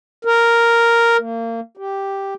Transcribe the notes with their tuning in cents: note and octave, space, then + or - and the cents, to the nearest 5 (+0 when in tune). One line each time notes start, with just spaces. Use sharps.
A#4 +0
A#3 -30
G4 +0